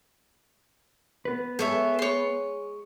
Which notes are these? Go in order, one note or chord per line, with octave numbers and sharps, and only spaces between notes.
B3 B4
G#3 G#4 A4 C#5 E5
C#5 C6